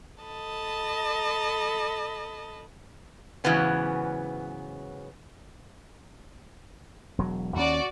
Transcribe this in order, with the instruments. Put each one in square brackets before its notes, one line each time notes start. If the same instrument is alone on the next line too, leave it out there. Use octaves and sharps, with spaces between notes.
[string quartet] A4 D#5 A5 B5
[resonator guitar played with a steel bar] G#2 C#3 E3 F#3 B3 C#4
[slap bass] E1 F#3
[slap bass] D#2 C#4 [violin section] F#4 D5